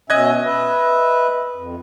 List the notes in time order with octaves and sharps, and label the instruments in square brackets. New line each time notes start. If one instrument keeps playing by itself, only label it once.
[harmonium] B2 C#4 E5 [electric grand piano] D#5 F#6 G#6
[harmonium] B4 E5
F2